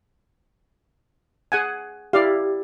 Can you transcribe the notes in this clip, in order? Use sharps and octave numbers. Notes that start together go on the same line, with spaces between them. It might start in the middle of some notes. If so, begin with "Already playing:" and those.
G#4 F#5 G#5
E4 G4 D5 F5